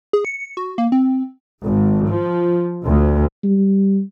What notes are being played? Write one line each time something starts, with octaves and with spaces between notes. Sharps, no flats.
G#4
C#7
F#4
A#3
C4
G#1
F3
D2
G3